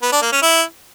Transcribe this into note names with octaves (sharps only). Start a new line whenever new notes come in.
B3
D4
A#3
C#4
E4